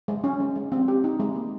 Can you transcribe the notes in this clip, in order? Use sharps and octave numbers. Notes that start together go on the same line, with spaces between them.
G#3
C#4
G#3
G#3
C4
G4
D#4
G#3
A#3